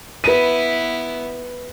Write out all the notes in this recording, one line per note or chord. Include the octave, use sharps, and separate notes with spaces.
B3 E4 B4 D#7